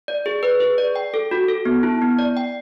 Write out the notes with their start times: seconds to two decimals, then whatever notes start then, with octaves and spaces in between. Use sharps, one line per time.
0.08 D5
0.26 G#4
0.43 B4
0.60 G#4
0.78 D5
0.96 G5
1.14 A4
1.31 F#4
1.48 A4
1.65 B3
1.83 E4
2.02 B3
2.19 D5
2.37 G5